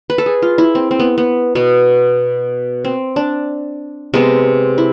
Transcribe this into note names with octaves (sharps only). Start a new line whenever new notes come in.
B4
A4
G#4
F4
E4
C4
C4
B3
B3
B2 B3
C4
D4
C3 G#3 B3
E4